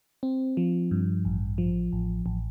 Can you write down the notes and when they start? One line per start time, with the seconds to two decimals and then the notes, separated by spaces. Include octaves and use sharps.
0.23 C4
0.57 F3
0.91 G2
1.25 A1
1.58 F3
1.93 A1
2.26 A1